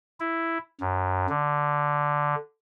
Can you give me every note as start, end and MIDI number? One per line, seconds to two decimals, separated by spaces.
0.20 0.58 64
0.81 1.27 42
1.29 2.35 50